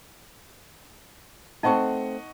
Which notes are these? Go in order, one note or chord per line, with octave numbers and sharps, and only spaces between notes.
A3 C4 D#4 A4 D#5 F#5 C#6